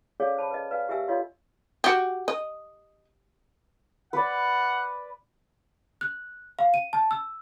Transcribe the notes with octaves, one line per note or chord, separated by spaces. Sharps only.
C#4 G#4 A4 C#5 D5 F5
C5 C#5 A5 B5
B4 D#5
B4 D5 F5 G#5
G4 A#4 E5 F5 G#5 E6
F4 A4 C#5 D#5 F5 C6
F#4 G4
D#5
B4 D5 F#5
F#6
F5
D#7
A5
E6